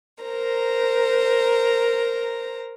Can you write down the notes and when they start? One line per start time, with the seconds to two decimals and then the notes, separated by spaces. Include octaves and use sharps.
0.23 A#4 C5 A#5